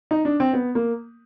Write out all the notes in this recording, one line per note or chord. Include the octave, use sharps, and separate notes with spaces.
D#4
D4
C4
B3
A#3